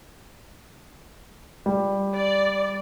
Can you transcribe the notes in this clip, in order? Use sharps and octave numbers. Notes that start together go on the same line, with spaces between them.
G3
D5